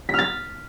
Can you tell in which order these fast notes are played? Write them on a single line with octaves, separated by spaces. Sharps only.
B6 F6 A6